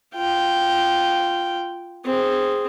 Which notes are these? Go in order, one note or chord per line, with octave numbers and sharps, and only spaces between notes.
F4 G5
C4 G#4